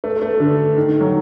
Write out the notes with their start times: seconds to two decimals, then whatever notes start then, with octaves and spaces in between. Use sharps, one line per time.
0.04 A3
0.22 A3
0.40 D3
0.77 D#3
0.88 D#3
1.00 F#3